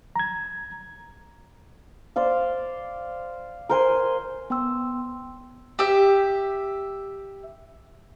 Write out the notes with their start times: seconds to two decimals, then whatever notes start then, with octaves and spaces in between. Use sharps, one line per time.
0.16 A#5 G#6
2.16 C5 D5 F5
3.69 A#4 C5 G#5
4.50 B3 G5 C6 E6
5.79 G4 E5